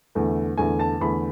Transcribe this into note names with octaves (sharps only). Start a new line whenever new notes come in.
E2 D3 A3
E2 D3 A3 G#5
A5
E2 D3 A3 B5